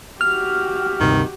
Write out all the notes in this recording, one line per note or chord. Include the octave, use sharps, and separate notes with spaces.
F#4 G4 F6
D2 G2 C3 D#3